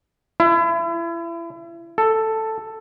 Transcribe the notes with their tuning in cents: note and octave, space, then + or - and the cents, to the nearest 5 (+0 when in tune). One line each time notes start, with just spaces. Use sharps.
E4 +35
A4 +5